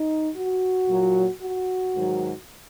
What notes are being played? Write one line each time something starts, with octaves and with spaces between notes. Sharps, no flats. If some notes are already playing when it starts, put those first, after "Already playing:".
Already playing: D#4
F#4
A#2 F#3
F#4
G#2 D#3 F#3